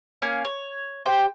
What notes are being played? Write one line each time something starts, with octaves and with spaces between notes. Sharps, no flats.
A#3 C#4 F5
C#5
G4 C5 G5